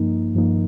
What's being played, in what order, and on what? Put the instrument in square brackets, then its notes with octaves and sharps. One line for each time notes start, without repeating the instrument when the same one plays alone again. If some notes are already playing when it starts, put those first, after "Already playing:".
Already playing: [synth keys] G2 F3 A#3 D#4
G2 F3 A#3 D#4